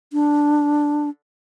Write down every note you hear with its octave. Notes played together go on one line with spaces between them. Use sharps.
D4